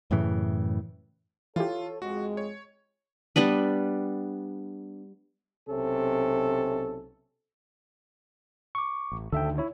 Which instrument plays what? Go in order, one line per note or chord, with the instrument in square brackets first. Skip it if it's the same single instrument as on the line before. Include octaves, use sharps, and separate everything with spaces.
[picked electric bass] F#2 A2 C#3 E3
[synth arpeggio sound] E3 G4 [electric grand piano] F4 [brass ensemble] A4 C#5
[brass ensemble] F2 G#3 [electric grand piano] F#4
[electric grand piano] C#5
[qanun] G3 B3 D4 B4
[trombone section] B1 C3 C#4 A4
[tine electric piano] C#6 D6
[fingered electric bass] A1
[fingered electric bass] D2 D3 D#3 [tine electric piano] A4 E5 G5
[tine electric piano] E4 C#5